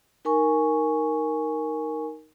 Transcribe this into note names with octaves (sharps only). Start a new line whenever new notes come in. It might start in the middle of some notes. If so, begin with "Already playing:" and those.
D#4 A#4 G#5 C#6